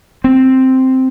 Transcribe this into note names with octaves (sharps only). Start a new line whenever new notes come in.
C4